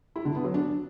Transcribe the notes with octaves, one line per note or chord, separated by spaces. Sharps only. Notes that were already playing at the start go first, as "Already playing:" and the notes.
E4
D3
B3
F#3
D4